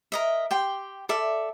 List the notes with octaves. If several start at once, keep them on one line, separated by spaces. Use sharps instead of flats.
A#4 D#5 E5
G4 G5 C6
A4 D5 E5